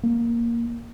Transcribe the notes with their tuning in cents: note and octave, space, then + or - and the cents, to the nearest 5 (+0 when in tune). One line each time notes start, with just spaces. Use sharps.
A#3 +0